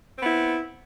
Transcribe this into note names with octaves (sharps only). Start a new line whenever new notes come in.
B3 C4 E4